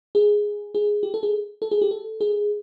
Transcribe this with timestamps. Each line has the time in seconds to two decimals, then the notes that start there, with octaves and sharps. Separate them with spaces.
0.15 G#4
0.75 G#4
1.03 G4
1.14 A4
1.23 G#4
1.62 A4
1.71 G#4
1.82 G4
1.91 A4
2.21 G#4